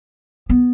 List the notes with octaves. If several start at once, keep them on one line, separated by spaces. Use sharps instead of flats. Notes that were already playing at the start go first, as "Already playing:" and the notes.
B3